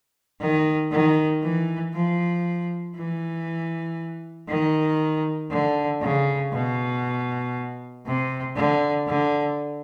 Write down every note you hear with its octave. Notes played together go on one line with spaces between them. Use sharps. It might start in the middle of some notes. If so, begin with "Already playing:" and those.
D#3
D#3
E3
F3
E3
D#3
D3
C#3
B2
C3
D3
D3